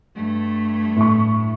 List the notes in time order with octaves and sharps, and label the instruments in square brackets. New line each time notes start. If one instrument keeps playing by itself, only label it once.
[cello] G2 A3
[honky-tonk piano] A2 C#6